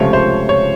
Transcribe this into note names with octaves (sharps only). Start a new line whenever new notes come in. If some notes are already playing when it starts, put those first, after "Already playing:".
Already playing: C#2 C3 F3 A3 C#5
C5
C#5